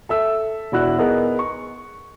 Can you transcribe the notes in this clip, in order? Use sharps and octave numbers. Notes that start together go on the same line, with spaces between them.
A4 E5 E6
E1 D4 E4 F#4 E6 F#6
B3 D#4 G#4 A#4
C#6